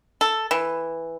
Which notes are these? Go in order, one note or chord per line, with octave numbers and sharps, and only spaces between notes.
A4
E3